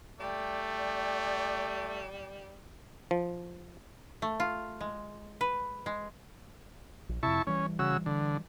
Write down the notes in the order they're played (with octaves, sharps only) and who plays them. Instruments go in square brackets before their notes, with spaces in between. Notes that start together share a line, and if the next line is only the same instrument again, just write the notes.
[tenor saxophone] G3 [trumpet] A3 [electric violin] D5 G5
[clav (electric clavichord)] F3
[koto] A3
F4
G#3
B4
G#3
[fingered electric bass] A#1
[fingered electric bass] F2 C3 [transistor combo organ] E4 A5 C#6
[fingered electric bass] E3 G3 [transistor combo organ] C#4
[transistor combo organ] C#3 F#4 E6
D3